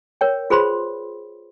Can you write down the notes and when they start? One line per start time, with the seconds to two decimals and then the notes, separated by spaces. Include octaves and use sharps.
0.21 A#4 C#5 G5
0.50 F4 G#4 B4 C5 B5 C6